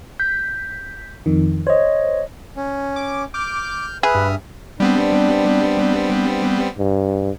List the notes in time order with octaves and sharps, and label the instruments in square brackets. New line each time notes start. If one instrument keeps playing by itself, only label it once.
[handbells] G6 [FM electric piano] B6
[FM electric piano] F2 D#3
[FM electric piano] C5 [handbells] C#5 D#5
[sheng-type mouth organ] C#4
[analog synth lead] D6
[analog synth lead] D6 [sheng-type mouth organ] F6 G6
[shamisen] G#4 [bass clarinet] B4 [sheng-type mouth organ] E5 D#6 F6
[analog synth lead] G2
[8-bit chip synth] G3 B3 C4 [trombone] D4
[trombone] G2